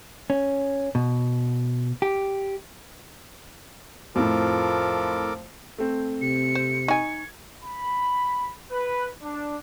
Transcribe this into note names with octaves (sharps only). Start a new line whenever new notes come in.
C#4
B2
G4
F2 A2 F3 A4 A#4 D6
A3 C4
C3 C#7
C5
D#4 G#5 C#6 G#6
B5
B4
D4